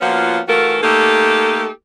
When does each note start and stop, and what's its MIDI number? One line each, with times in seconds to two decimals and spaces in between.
0.01 0.39 53
0.01 0.39 58
0.01 0.39 59
0.01 0.39 61
0.01 0.39 65
0.01 0.39 66
0.48 0.78 52
0.48 0.78 57
0.48 0.78 65
0.48 0.78 66
0.48 0.78 69
0.48 0.78 70
0.83 1.69 57
0.83 1.69 58
0.83 1.69 63
0.83 1.69 67
0.83 1.69 69